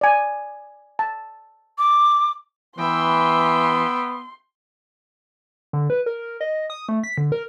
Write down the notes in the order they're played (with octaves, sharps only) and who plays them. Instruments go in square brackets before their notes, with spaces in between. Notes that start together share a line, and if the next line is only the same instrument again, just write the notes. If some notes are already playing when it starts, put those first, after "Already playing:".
[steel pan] D5 G#5
A5
[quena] D6
[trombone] E3 [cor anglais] B3 [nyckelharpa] E5 G5 [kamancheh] C6
[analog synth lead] D3
B4
A#4
D#5
D#6
A3
B6
D3
A#4